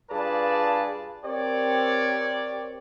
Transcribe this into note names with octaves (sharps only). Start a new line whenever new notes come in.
G2 F4 G#4 B4 D5 A5
C4 G4 A#4 C#5 D5